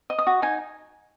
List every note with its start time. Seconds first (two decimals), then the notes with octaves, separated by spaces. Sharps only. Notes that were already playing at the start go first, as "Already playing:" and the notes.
0.10 D#5
0.18 D#6
0.27 F#4
0.42 D#4 G#5